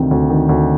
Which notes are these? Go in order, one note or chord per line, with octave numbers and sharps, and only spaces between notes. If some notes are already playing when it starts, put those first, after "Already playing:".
Already playing: D2 C3 D#3
D2
D#3
D2